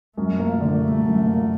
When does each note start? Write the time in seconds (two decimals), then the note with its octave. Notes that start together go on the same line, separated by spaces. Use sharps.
0.17 F#2 A3
0.39 A#3
0.61 D3
0.83 G3
1.05 F#2
1.27 A#3